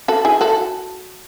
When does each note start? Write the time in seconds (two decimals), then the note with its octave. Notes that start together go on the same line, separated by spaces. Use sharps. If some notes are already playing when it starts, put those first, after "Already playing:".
0.08 F#4 A4
0.25 E4 G#4
0.41 F#4 A4